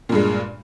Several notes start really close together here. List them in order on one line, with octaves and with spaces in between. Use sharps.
A#2 G2 G#3